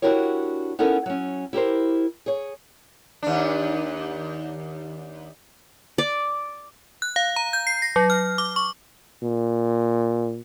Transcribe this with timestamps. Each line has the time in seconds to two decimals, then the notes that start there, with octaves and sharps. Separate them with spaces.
0.02 D4 E4 F#4 G4 A#4 C#5
0.79 B3 C#4 D#4 E4 A4 A#4
1.06 F#3 C#4
1.53 E4 G4 A#4 C5
2.26 G#4 C#5
3.23 D#2 D4
5.98 D5
7.02 F#6
7.16 F5
7.36 A#5
7.53 G6
7.67 C7
7.82 A#6
7.96 F#3
8.10 F6
8.38 D6
8.56 C#6
9.23 A#2